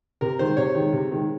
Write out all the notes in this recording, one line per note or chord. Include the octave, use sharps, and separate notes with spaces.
C3 A#4
D#3 G#3 C5
C3 C#5
D#3 G#3
C3
D#3 G#3